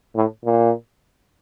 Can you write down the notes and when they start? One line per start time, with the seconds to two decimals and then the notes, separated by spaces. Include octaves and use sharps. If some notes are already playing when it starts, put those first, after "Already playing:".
0.15 A2
0.45 A#2